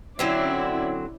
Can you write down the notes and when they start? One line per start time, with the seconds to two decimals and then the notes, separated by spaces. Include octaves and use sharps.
0.19 D3 F#3 C4 C#4 E4 D5